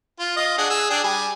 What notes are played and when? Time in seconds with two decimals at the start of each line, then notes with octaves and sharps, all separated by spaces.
0.20 F4
0.37 F4 D#5
0.58 D4 G#4 F#5
0.70 G#4 E6
0.90 D4 G4 G#4
1.04 G3 G#5